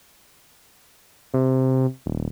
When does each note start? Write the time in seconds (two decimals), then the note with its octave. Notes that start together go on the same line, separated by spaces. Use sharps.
1.34 C3
2.06 D#1